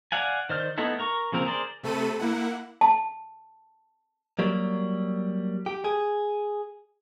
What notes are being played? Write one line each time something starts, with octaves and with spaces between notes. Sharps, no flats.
D5 F5 F#5 G#5
D#3 C5 D5 F6 G6
A3 B3 D#4 E4 A4
A#4 A#5 C#6
C#3 F3 A#3 C4 A#4
G#4 A#4 C5 D5
C3 A3 A4 B5 D#7
A#3 E4 F#5
A5
F#3 G3 A#3
G4
G#4